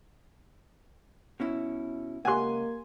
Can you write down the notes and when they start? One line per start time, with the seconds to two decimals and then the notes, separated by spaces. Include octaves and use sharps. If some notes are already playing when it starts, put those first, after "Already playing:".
1.40 B2 C#4 E4
2.25 C#2 A#3 G4 F#5 G#5 C6